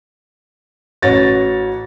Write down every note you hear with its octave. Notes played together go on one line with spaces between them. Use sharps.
A1 F#4 C#5 A6 A#6